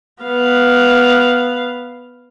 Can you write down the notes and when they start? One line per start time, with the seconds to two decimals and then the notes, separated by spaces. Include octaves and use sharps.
0.23 B3 F5